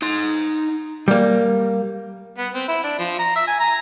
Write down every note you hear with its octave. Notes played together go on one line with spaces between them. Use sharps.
D#4 C6
G3 A#3
B3
C4
E4
D4
F3
A#5
E5
G#5
A#5